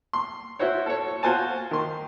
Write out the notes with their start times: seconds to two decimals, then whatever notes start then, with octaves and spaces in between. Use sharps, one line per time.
0.13 C6
0.59 E4 F#4 C5 C#5
0.86 A4 C#5
1.23 F4 F#4 C5 G#5 A5
1.71 D#3 C6